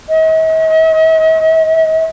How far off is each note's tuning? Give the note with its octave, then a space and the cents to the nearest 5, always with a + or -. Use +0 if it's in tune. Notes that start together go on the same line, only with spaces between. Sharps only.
D#5 +45